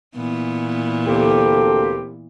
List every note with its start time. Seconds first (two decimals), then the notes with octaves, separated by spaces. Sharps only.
0.16 A#2 E3 B3
1.07 D2 A#3 C4 G4 A4